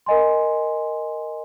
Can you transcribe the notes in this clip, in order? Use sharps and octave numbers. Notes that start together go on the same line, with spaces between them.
A#4 D#5 G#5 C6